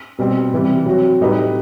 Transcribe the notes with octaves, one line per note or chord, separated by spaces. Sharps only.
B2 G3 C4
C3 E3 G3
F#3 C4 F#4
A2 G3 D#4 G4 B4